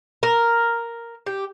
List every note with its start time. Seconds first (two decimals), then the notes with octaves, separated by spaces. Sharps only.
0.23 A#4
1.26 G4